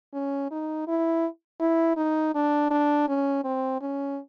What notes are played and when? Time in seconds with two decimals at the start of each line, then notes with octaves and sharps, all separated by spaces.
0.14 C#4
0.51 D#4
0.87 E4
1.61 E4
1.97 D#4
2.35 D4
2.71 D4
3.08 C#4
3.44 C4
3.81 C#4